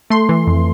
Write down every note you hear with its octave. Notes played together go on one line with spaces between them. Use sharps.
A3 C6
E3
F2